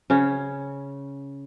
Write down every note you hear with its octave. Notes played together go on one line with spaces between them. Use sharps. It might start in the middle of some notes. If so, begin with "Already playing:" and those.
C#3 C#4